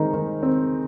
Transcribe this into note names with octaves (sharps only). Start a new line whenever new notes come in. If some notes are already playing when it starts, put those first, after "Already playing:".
Already playing: D#3 G#3 C4 D#4
D#3
C4